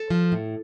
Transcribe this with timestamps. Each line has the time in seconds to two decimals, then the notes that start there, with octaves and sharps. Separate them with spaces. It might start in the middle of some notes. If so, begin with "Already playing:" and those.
Already playing: A4
0.10 F3
0.32 A2